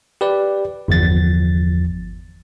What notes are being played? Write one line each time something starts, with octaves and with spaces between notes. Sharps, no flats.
G4 B4 D5
G1 E2 F3 A6